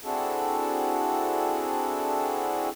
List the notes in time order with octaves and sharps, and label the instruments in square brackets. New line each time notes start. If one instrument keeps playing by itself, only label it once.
[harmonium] C4 D4 E4 F#4 G#4 A4